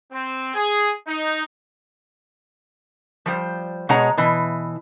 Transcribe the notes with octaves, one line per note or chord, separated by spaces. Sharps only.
C4
G#4
D#4
F3 G3 C5
B2 G#3 C#5 F#5 A#5
B2 E3